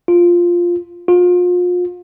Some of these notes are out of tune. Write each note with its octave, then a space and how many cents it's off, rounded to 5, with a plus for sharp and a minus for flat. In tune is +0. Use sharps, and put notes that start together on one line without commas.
F4 +0
F4 +35